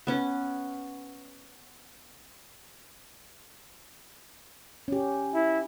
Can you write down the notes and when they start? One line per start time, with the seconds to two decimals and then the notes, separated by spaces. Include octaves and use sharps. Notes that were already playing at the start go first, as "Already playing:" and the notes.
0.07 B3 C#4
4.88 C#4 G4
5.34 E4